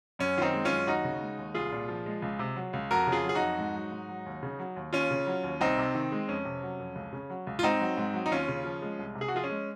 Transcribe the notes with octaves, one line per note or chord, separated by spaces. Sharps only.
F#2 C#4
D#3 C4 D#4 F4
G#3
C#4 F4
F#2
D#2 D#4 F#4
C#3
G#3
D#2
C2 F4 G#4
A#2
F3
G#3
C#2
C3
F#3
C#2
F2 F#4 A#4
C#3
F4 G#4
F#3
G#4
D#4 F#4
F2
G#2
F#3
G#2
F#3
D#2
C#3
F#3
D#2
D#2 C#4 F4
C#3
F#3
D#2
C2 C4 D#4
C3
D#3
G#3
F2 C#4
C3
F#3
F2
C#2
C#3
F#3
C#2
F4
G#2 C4 D#4
F#3
G#2
F#3
D#4
D#2 C#4 F4
C#3
F3
G#3
C2
C3
G#4
F#4
F3 F4 G#4
C#4
G#3